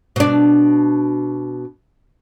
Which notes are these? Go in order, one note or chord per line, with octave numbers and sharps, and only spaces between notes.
B2 D4